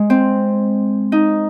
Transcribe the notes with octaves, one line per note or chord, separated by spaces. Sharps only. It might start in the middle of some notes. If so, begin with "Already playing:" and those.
Already playing: G#3
C4
D#4